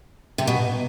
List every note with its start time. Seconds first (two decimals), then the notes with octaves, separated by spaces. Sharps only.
0.38 C3
0.47 B2